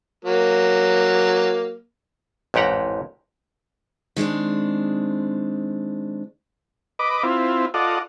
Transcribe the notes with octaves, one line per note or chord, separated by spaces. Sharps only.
F#3 A#3
A1 F2 G#2 G4 F#5 A#5
D#3 G#3 C4 D4
B4 D#5 D6
C4 E4 F4
F4 A4 D5 D#5 F#5